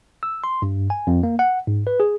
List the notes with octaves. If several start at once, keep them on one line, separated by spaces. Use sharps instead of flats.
E6
C6
G2
G#5
F2
A#3
F#5
G#2
B4
G#4